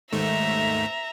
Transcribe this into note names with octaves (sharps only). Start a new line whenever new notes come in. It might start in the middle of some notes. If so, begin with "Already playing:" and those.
D#2 G#2 A3 E5 A#5